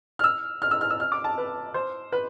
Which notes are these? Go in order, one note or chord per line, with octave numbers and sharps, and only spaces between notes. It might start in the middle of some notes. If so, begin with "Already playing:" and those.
F6
E6
F6
E6
F6
E6
F6
D6
A5
B4
C5
B4